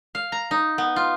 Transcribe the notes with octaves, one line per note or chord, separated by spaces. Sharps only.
F5
A#5
D#4
B3
F4